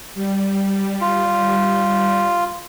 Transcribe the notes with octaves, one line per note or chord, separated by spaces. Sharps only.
G3
F4